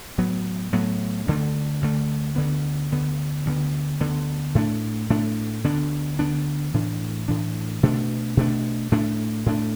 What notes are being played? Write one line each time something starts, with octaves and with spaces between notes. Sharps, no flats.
A2 F#3 B3
A2 F#3 B3
D2 D3 A3
D2 D3 A3
D2 D3 B3
D2 D3 B3
D2 D3 B3
D2 D3 B3
A2 A3 D4
A2 A3 D4
D2 D3 B3 D4
D2 D3 B3 D4
A2 E3 D4
A2 E3 D4
B2 A3 D4
B2 A3 D4
A2 A3 D4
A2 A3 D4